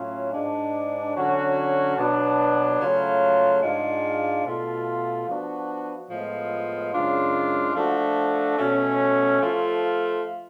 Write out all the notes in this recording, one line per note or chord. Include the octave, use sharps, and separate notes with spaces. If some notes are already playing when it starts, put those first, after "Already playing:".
Already playing: A2 F#3 C#4 F4
G#2 G#3 D4
D3 F#3 C#4 F#4
B2 F#3 B3 D4
C#3 F#3 A3 F4
G#2 G#3 D4 F4
B2 A3 F4
F3 B3 D4 F#4
A2 F3 G#3 B3 F4
F#2 C#3 G#3 D4 F4
F3 A3 D4 F#4
B2 A3 C#4
F3 A3 F4